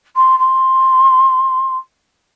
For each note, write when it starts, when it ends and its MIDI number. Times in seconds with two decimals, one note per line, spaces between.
0.16 0.38 84
0.39 1.77 84